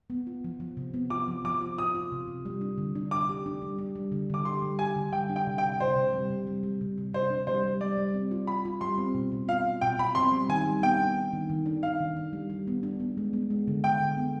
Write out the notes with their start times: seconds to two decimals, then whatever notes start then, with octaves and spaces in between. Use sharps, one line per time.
0.10 B3
0.27 F4
0.44 F3
0.60 F3
0.77 C3
0.94 B3
1.10 F4 D6
1.28 F3
1.44 F3 D6
1.61 F4
1.78 F4 D#6
1.95 F4
2.12 C3
2.28 C3
2.45 G3
2.61 D4
2.78 D3
2.95 D4
3.11 D4 D6
3.29 G4
3.46 D4
3.62 G3
3.78 D4
3.95 G3
4.12 D3
4.30 D3 D6
4.45 G4 C6
4.62 G3
4.79 G4 G#5
4.96 D3
5.12 G3 G5
5.30 D4
5.36 G5
5.47 C3
5.58 G5
5.63 C3
5.80 C3 C5
5.96 C3
6.13 G3
6.30 C3
6.47 G3
6.63 G3
6.81 C3
6.98 C3
7.13 C3 C5
7.30 D4
7.47 G3 C5
7.64 G3
7.81 G3 D5
7.98 G3
8.14 C4
8.31 F4
8.47 F4 B5
8.65 F4
8.81 G3 C6
8.98 C4
9.15 B2
9.32 B2
9.48 F4 F5
9.65 F4
9.81 B2 G5
9.98 B2 B5
10.15 C4 C6
10.32 G3
10.49 D#3 G#5
10.66 G3
10.82 B3 G5
11.00 D4
11.16 D4
11.33 D#3
11.50 D#3
11.66 D4
11.83 D4 F5
12.00 D#3
12.17 D4
12.33 G3
12.50 G3
12.67 B3
12.83 D4
13.00 B3
13.17 G#3
13.33 B3
13.50 G#3
13.68 D3
13.84 D3 G5
14.00 D3
14.17 B3